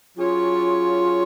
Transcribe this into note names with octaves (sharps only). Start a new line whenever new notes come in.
F#3 C#4 F4 G#4 C#5